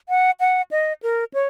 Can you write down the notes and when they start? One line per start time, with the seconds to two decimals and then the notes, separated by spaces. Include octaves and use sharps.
0.09 F#5
0.40 F#5
0.71 D#5
1.03 A#4
1.34 C#5